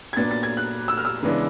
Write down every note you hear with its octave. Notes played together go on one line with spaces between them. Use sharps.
G#6
A#2 F#3 B3 D4 A6
A6
G#6
F#6
E6
F6
E6
C#3 E3 G#3 B3 D4